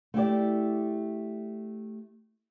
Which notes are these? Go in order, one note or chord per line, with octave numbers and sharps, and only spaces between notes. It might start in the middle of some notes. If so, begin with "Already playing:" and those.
A3 E4 G4 D5